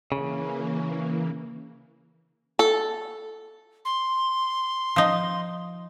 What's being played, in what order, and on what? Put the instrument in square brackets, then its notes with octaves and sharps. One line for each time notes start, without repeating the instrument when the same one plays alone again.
[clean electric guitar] C#3 [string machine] E3 A#3
[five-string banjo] A4
[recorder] C6
[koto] F3 D#4